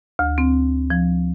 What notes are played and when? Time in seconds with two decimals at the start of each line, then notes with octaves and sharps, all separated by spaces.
0.19 D2
0.38 C4
0.90 F3